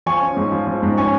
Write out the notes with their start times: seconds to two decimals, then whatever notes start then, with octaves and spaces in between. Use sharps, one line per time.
0.06 F3 G#5 C#6
0.21 C#4
0.37 G#2
0.52 F3
0.67 F3
0.83 G#2
0.97 C#4 G#5 C#6